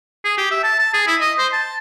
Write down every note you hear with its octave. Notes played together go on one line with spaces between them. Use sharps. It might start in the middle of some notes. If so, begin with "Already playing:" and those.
G#4
G4
E5
A5
A5
G#4
E4
D#5
C5
A5